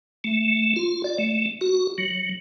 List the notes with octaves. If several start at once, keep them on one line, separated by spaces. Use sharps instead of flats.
A3
F4
D5
A3
F#4
F#3